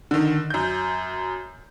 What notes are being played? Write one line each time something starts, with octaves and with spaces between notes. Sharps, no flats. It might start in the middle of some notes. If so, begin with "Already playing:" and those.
D3 D#3
F#2 G6